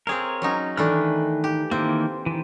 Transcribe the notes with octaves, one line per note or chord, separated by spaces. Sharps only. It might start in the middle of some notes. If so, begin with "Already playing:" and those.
C4 G#4 A#4 C#5 F5
F#3 C#4 D#4
D#3 E3 A3 D4 B4 F6
G4
D#3 E3 A#3 C4
D#3 E3